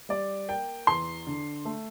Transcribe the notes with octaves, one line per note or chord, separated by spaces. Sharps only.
G3 D5
A#3 G5
E2 C6
D3
A3